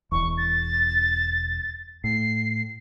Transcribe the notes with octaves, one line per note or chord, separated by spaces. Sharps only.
E1 E2 C#6
A6
A2 C7